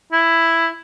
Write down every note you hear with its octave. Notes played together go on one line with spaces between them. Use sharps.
E4